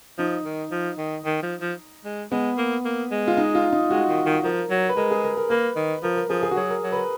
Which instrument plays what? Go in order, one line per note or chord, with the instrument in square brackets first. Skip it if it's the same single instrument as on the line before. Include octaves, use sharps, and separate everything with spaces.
[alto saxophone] F3 [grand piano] D#4
[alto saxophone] D#3
F3
D#3
D#3
F3
F3
G#3
[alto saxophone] G#3 [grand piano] B3
[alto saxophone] A#3
A#3
G#3
[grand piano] F4
D#4
F4
D#4
[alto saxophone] G#3 [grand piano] F#4
[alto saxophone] D#3
D#3
[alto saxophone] F3 [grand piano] A#4
[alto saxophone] F#3
[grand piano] B4
[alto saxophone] G#3 [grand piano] A#4
[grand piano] G#4
A#4
A#4
[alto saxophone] A#3 [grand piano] B4
[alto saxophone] D#3
[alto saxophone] F3 [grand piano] A#4
[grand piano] A#4
[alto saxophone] F3 [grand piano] G#4
[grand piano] G#4
F#4
[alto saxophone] F#3 [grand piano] G#4
[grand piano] A#4
[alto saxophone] F#3
[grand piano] B4
A#4